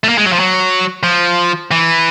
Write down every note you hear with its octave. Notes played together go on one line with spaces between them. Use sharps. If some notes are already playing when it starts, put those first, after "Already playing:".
A3
A#3
G#3
F#3
F3
F#3
F3
E3